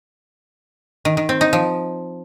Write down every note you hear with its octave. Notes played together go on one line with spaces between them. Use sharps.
D#3
D#3
C4
D#4
F3